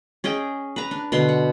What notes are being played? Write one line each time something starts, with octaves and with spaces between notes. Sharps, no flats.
C#4 G#4 D#5 G5
B4 A#5
D4
B2 D3 C6
F#5